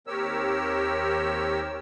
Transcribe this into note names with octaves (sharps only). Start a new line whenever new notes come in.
D#2 C4 G4 A#4 C#5 E6